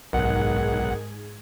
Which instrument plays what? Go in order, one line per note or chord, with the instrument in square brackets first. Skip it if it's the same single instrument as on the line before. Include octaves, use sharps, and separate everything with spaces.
[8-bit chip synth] B1 F#5 [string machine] G#2 G#4 G#6 [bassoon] D#3